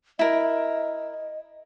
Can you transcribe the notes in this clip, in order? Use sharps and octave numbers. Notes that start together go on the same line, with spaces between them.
E4 A#4 D#5